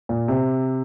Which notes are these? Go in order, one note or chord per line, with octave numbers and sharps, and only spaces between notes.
A#2
C3